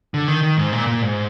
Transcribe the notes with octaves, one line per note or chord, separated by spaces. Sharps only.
D3
D#3
D#3
G#2
A#2
A#2
G#2